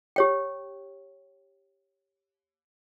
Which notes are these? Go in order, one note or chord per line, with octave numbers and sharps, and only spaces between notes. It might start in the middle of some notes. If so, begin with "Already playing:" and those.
G4 C#5 G5